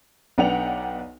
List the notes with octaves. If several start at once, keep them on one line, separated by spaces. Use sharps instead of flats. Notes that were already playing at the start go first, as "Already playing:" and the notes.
B1 B3 D4 F#5 G5 F7